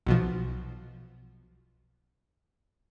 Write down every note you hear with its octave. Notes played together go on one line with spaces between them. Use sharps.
B1 B2 F3